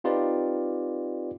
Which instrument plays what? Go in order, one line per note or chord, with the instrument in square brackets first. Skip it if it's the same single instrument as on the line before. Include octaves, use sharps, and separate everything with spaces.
[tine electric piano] C4 D#4 F4 G4 B4 D5